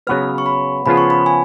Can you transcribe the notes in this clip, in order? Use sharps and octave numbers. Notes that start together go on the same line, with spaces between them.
C#3 F#3 B3 F#4 B4 F6
C#6
B5
C#3 F3 B3 F4 G#4 B5
C#6
B5
G#5